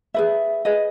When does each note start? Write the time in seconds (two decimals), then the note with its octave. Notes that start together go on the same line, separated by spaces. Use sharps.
0.14 G#4 B4 E5
0.65 G#4 B4 D#5